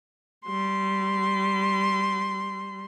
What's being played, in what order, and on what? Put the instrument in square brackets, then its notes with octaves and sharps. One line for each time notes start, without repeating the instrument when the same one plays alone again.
[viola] G3 C6